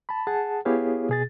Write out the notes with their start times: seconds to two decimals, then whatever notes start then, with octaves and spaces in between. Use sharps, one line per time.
0.09 A5 B5
0.27 G#4 F#5 A5
0.65 B3 E4 G4 G#4 C#5 F5
1.09 B2 G#4 A6